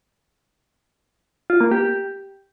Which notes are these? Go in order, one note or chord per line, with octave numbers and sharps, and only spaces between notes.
F4
A#3
G4